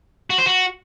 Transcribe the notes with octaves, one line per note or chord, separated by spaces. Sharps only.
F#4
C5
F#4